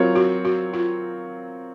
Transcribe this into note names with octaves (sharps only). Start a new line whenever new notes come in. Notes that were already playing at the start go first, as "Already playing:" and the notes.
Already playing: F#3 C4 F4 A#4 C#5
F#4
F#4
F4